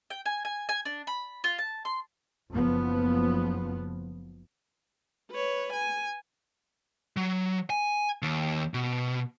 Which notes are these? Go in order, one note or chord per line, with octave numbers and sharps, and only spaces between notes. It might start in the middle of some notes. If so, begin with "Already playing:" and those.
G5
G#5
G#5
G#5
D4
B5
F4
A5
C6
F#1 F3 B3
B4 C#5
G#5
F#3
G#5
D#2
B2